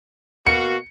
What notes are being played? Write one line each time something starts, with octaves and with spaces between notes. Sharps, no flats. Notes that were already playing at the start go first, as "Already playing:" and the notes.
B2 A#3 F#4 C#7